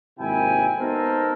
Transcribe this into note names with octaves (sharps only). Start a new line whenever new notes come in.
G#1 C3 A#3 E4 G5 G#5
B3 D#4 F#4 A4 A#4 C5